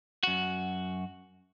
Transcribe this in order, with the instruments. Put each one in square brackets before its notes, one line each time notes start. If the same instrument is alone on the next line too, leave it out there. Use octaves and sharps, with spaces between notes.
[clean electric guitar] F#2 F#4